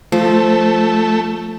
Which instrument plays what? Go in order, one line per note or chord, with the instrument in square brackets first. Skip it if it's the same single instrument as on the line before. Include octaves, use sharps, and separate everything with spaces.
[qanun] F3 [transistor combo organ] A3